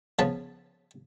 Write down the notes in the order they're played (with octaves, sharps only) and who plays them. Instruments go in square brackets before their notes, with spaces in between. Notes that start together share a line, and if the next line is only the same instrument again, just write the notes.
[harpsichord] C#3 F3 B3 B4 A5